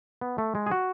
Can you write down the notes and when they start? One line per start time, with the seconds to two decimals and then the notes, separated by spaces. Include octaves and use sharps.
0.21 B3
0.38 A3
0.55 G#3
0.66 G#4
0.71 F#4